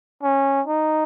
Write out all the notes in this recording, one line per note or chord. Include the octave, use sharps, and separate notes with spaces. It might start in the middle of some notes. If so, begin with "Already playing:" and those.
C#4
D#4